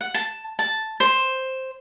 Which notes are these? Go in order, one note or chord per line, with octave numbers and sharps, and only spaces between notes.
F#5
A5
A5
C5